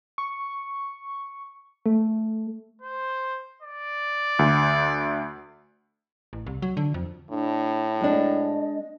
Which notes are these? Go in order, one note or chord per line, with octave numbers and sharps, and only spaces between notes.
C#6
A3
C5
D5
D2
A1
C2
F#3
D3
F2
A2 D4
G#3 D4 D#5